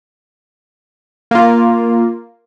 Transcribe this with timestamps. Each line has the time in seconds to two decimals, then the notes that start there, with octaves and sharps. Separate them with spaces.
1.31 A#3 F4